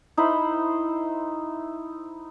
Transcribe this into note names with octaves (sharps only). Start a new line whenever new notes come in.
D#4 E4 C5 B5